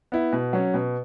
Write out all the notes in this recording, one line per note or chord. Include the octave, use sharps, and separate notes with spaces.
B3 E4
B2
F#3 C#4
B2